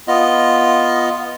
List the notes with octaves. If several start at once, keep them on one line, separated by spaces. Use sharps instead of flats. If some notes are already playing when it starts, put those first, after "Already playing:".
B3 F4 D#5